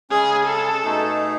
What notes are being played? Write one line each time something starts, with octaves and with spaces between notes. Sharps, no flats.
C#3 G#3 C#4 G#4
A4
B2 A3 D#4 G#4